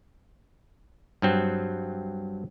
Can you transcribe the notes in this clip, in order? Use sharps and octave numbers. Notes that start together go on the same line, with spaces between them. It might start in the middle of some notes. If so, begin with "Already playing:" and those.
G2 F#3 C4